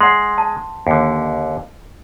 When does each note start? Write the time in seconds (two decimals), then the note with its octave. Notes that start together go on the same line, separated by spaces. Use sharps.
0.01 G#3 F#5 C6
0.38 A5
0.87 D#2 D3